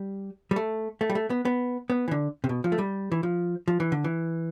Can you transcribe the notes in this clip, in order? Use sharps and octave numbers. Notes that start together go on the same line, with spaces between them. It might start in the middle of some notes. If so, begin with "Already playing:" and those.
Already playing: G3
G3
A3
A3
G3
A3
B3
B3
B3
E3
D3
C3
B2
F3
A3
G3
E3
F3
F3
E3
D3
E3